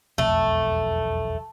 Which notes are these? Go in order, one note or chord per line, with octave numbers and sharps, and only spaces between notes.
E1 B1 F2 A3